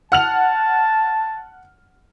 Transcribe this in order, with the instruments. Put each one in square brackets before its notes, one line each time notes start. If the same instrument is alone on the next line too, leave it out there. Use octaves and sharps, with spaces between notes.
[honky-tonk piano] F#5 F6 F7 [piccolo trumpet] A5